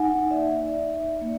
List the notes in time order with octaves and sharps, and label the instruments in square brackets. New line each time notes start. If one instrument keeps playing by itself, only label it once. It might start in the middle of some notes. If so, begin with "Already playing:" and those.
Already playing: [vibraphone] D#4 F#5 G#5
A#3 D5 E5
D#4
A#3